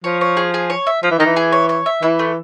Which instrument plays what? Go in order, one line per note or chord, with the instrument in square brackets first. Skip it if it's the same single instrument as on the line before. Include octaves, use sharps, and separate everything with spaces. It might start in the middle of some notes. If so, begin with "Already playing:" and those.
[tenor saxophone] F3 [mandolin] C#5
[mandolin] C#5
G#4
G#4
C#5
E5
[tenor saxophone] F3 [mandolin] E5
[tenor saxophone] E3
[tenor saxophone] D#3 [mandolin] D#4
[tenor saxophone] E3
[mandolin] G#4
C#5
C#5
E5
[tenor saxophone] E3 [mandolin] E4
[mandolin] A3